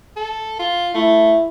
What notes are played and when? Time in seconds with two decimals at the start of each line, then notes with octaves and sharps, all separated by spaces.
0.17 A4
0.59 F4
0.94 A3 E4